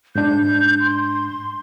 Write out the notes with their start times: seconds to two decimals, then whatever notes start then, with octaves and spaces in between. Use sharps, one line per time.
0.15 G#2 D4 G6
0.80 C6